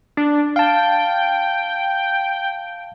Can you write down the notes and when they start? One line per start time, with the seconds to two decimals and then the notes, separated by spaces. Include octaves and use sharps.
0.17 D4
0.56 F5 G5 A5